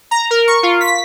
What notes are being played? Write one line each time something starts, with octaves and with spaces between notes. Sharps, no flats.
A#5
A#4
C#6
F4
B6